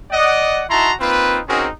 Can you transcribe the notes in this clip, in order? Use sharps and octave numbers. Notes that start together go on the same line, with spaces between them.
D5 D#5 F#5
D#4 E4 F#4 A5 A#5 C6
A#3 C4 D#4 F4 B4
C4 C#4 D#4 F#4 G#4 A#4